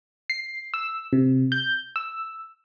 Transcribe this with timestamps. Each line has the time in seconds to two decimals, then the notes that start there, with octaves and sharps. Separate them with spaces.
0.30 C7
0.74 E6
1.13 C3
1.52 G6
1.96 E6